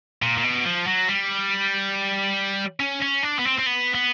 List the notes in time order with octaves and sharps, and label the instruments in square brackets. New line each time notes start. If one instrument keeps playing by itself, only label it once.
[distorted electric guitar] A#2
A#2
B2
F3
F#3
G3
C#4
C#4
D4
B3
C4
C4
B3
B3